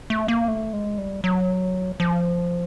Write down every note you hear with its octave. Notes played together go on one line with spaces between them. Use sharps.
A3
A#3
A3
G#3
G3
F#3
F3